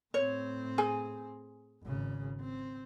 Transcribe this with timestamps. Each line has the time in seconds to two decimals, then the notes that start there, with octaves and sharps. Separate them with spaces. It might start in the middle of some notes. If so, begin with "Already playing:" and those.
0.14 A2 C4 C#5
0.78 G#4 G#5
1.83 G#1 C#3
2.41 C4